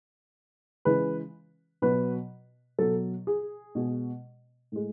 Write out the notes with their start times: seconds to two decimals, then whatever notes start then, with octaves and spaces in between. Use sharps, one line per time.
0.85 C#3 E3 G#3 B4
1.82 B2 F#3 B4
2.79 B2 F#3 A4
3.27 G#4
3.75 B2 G#3
4.72 A2 G#3